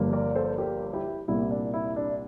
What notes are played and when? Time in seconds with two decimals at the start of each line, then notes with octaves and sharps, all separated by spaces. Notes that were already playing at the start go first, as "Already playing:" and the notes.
Already playing: G1 G2 F3 A#3
0.12 A#4 D5
0.35 A4 C5
0.58 G4 A#4
0.93 E4 G4
1.28 C2 A#2 G3 A#3 E4
1.51 D4
1.74 E4
1.96 D4